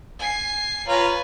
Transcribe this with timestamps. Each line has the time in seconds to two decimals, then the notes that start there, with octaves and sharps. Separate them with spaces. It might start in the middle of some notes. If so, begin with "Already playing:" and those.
0.19 G#5 C7
0.88 F4 B4 C#5 F5 G#5 A#5